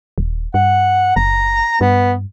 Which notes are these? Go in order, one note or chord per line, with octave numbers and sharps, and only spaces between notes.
D#1
G2 F#5
F#1 A#5
G2 B3